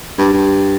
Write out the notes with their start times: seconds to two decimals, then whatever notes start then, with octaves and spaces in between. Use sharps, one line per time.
0.18 G2
0.34 G2